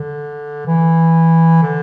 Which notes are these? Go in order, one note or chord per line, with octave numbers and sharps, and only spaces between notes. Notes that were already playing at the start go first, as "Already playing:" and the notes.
Already playing: D3
E3
D3